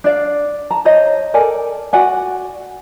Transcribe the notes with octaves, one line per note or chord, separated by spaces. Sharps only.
D4 D5 F5
A5 A#5
C5 C#5 D#5
A4 A#4 D5 G#5
F#4 D5 F#5 G#5